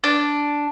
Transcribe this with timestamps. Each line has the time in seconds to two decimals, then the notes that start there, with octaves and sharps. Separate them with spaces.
0.04 D4